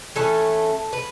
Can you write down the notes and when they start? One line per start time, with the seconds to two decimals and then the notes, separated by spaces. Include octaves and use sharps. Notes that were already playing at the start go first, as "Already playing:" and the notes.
0.16 E3 A3 C#4 A4
0.93 B4